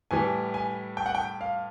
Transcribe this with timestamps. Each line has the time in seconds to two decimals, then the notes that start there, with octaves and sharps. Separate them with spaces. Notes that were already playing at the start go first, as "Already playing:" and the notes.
0.11 A2 E3 G3 G#5
0.54 G#5
0.97 G5
1.06 F#5
1.15 G5
1.41 F5